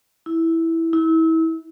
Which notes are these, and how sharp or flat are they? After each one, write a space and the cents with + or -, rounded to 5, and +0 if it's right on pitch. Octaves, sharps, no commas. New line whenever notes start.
E4 -5
E4 -30